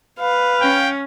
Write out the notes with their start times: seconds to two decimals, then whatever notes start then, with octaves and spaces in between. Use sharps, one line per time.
0.20 B4 F5
0.62 C#4 G5